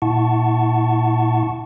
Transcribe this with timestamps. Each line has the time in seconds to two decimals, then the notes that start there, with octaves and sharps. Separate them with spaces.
0.02 A#2 E4 F#5 A5 C#6